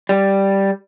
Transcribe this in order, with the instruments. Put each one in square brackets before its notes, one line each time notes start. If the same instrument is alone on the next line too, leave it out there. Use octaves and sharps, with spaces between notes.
[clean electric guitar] G3